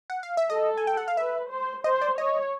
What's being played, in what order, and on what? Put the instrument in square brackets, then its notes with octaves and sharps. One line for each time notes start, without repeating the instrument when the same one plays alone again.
[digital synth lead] F#5
F5
E5
[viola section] A4 [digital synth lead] D#5
[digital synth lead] G#5
G5
F#5
F5
[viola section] B4 [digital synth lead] E5
[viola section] C5
[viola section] C5 [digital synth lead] D#5
[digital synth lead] D5
[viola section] C#5 [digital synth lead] D#5